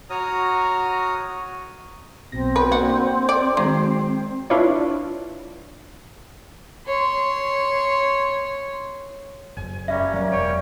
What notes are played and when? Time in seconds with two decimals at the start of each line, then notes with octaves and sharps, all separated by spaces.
0.10 F#4 C#5 A#5 D#6 F6
2.32 B1 B2 C4 A#6
2.56 F#4 B4 C#5
2.72 A#3 D4 F#4
3.29 D5
3.57 D#3 F#3 G#3 C7
4.50 D4 E4 F4 B4 C#5 D5
6.87 C#5 C6
9.57 F#1 G#5
9.88 G3 A#3 C#4 E5
10.14 F#3 A#4
10.32 E1 C#5 G5